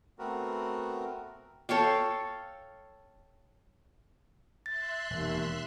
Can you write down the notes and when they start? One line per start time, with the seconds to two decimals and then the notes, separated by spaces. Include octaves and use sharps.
0.19 A3 B3 C4 F#4 A#4
1.69 A4 C#5 F5 G5
4.66 E5 C6 F#6 A6
5.10 E1 D#2